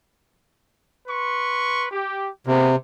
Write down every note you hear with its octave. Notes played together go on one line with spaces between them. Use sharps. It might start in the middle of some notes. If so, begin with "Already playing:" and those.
B4 C6 C#6
G4
C3 A#3 B3 G#4